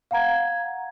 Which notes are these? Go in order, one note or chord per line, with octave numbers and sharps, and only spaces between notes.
F5 F#5 A#5 G#6